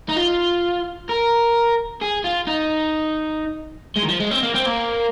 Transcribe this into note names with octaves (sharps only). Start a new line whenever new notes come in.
D#4
F4
A#4
G#4
F4
D#4
G#3
D#3
F3
G#3
C4
A#3
C4
A#3